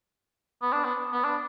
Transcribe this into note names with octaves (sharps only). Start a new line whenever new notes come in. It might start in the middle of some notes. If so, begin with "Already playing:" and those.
B3
D4
B3
B3
D4